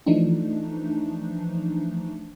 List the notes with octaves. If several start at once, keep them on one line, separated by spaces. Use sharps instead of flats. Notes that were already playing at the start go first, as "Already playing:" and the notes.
E3 F3 A3 D4 D#4